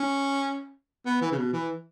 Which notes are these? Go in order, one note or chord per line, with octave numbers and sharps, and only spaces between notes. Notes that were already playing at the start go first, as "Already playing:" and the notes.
Already playing: C#4
B3
E3
C#3
B2
E3